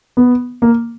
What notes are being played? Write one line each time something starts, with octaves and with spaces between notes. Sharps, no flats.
B3
A#3